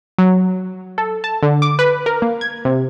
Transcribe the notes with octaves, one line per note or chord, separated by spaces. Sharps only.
F#3
A4
A5
D3
D6
B4
A#4
A#3
G#6
C3